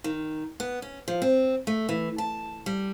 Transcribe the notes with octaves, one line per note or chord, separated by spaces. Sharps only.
D#3
B3
C#4
F3
C4
A3
E3
A5
G3